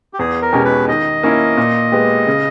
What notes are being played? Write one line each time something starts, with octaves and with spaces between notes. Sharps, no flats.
G4
E2 G#4
A#4
B2 G#3 C#4 G4
B4
D#3 D#5
A#3 C#4 E4
A#2
G#3 B3 G4
C#3